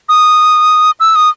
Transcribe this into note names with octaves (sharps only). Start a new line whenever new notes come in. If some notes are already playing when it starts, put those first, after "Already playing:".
D#6
E6
D#6